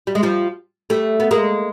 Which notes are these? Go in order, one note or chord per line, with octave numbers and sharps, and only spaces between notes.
G3
G#3
F3 G3
G3 A3
B3
G#3 A#3